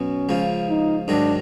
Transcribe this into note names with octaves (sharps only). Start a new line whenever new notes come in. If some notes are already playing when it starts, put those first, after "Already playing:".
Already playing: B2 F#3 B3 C#4
C#2 C#3 F3
D#4
G#2 D#3 F#3 D4